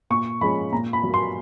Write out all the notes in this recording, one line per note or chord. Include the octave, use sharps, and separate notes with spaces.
A#2 C#6
F3 G#3 C#4 B5
A#2 A#5
B5
F#3
A#3
C6